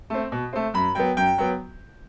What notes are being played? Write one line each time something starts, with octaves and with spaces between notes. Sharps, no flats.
A3 C4
B2
A3 C4
F#2 B5
F#3 B3 G5
F#2 G5
F#3 B3